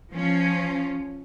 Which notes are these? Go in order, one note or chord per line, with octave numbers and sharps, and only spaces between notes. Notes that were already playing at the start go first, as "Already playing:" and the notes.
F3 C#4